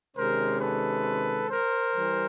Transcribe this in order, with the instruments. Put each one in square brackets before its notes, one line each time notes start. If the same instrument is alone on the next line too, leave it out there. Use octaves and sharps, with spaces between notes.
[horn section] C3 D#3 G#3 C#4 A#4 C5
A4 B4
A#4 C5
E3 G3